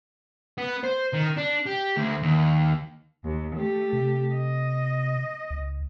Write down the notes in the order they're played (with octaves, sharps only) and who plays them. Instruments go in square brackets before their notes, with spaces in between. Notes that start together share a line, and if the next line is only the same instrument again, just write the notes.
[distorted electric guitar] B3
C5
D#3
D4
G4
D2
D#2
[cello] D#2
A3 G4
[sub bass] C3
[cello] D#5
[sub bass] C#2